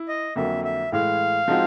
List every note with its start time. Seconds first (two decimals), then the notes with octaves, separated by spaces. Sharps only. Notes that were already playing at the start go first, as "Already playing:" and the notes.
Already playing: E4
0.08 D#5
0.36 F2 D3 F#3 A#3 E5
0.65 E5
0.92 A2 E3 G#3 F5
1.48 F3 G#3 C4 D#4 F#4